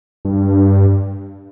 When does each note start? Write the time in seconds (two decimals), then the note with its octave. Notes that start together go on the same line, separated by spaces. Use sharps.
0.25 G2